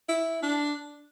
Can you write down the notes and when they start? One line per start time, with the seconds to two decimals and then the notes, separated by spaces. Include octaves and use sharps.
0.09 E4
0.42 D4